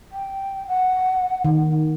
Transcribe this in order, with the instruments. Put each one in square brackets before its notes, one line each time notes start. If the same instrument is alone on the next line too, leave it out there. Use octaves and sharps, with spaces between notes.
[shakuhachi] G5
F#5
[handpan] D#3